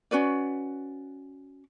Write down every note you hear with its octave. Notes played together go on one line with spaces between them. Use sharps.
C#4 F#4 B4 D5